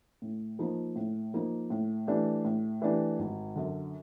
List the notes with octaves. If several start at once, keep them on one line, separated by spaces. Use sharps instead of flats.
A2
F3 A#3 D#4
A2
F3 A#3 D#4
A2
E3 A3 D4 G4
A2
E3 A3 D4 G4
G#1
F#2 D3